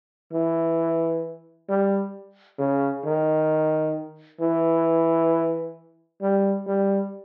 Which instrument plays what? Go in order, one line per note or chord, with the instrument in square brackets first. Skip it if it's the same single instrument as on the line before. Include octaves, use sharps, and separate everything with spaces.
[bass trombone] E3
G3
C#3
D#3
E3
G3
G3